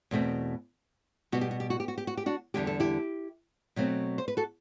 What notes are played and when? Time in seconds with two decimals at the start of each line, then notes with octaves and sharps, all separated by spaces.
0.11 E2 B2 A3 C4
1.32 B2 G3 B3 F#4
1.41 G4
1.51 F#4
1.60 G4
1.70 F#4
1.80 G4
1.88 F#4
1.98 G4
2.07 F#4
2.17 G4
2.26 D4 F#4
2.54 E2 D3 G3 G4
2.67 A4
2.80 E4 G4
3.76 B2 F#3 A3 C4
4.18 C5
4.28 B4
4.37 F#4 A4